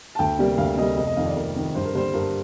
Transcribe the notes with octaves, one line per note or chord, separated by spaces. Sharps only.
A5
D2 G5
C3 G3 A#3
D2 F5
C3 G3 A#3 D#5
F1 D#5
D#5
F2 D#3 F5
D5
F1 A#4
F2 D#3
G2 C5
A#4
D3 G3 A#3 C5
G2 A#4